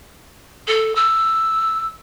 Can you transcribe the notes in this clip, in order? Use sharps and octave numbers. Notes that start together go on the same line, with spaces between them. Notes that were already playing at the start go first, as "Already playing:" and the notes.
A4
E6